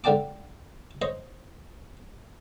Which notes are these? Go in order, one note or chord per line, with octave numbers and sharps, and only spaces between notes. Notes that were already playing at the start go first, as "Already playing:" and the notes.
G#2 D3 D5 G5 A5 D6
C5 C#5 D#5